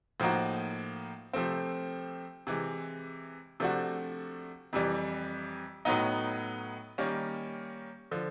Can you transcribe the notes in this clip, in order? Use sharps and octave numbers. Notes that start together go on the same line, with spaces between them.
A2 F3 A#3 D#4 F#4
C3 F3 A3 C4
C3 E3 G#3
C3 F3 A3 D4 F#4
F2 C3 E3 G3
A2 F#3 B3 D#4
D#3 G3 A#3 C#4
D3 F3